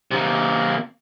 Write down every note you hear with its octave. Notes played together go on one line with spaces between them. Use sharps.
C3 A#3